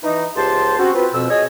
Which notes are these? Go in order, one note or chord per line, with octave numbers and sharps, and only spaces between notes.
E3 D#4
C#2 G4 C5 A5 C6
C4 C#4 F#4
C4 F4 B4
F2 B2 C4 E6
G#4 C#5 D#5